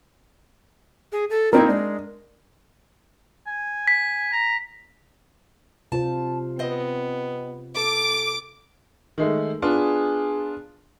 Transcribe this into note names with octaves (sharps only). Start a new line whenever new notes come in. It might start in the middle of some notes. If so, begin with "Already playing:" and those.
G#4
A4
A#3 C4 D#4 E4 A#4
G#3 D4
G#5
B6
A#5
C3 F4 C5 A5
B3 C4 D#5
A4 D6
D#3 G#3 A3
B3 D4 F4 G#4